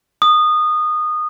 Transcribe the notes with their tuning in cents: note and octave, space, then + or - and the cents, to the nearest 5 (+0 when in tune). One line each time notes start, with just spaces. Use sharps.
D#6 -20